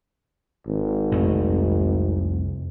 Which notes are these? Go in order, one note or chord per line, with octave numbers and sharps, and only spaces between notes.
G#1
C2 F2 A3